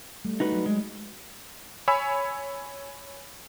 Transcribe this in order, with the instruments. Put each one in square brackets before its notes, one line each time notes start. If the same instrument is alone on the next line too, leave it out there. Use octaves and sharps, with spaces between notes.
[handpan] G3 A3
[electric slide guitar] D#4 F#4 B4
[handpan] F#3
[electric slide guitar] G#3
[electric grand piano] C#5 G#5 B5 E6